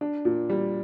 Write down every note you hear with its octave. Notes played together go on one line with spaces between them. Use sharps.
D4
A#2
G3